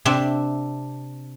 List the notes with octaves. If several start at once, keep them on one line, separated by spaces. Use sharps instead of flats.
C3 C4 D4 E5